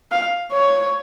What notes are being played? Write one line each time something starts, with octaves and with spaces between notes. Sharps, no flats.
F5
C#5